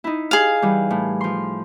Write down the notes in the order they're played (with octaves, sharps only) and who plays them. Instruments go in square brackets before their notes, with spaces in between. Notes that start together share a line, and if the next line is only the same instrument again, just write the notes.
[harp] D#4 E4
[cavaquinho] G#4 F5
[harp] E3 G3
A2
F3 C6